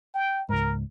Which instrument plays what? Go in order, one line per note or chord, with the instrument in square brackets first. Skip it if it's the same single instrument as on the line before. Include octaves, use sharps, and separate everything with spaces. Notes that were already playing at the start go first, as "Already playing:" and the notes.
[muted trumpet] G5
[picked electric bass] C#2 G#2 [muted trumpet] A#4